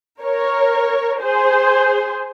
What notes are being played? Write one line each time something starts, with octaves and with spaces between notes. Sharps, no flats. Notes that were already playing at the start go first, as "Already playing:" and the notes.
A#4 C#5
G#4 C5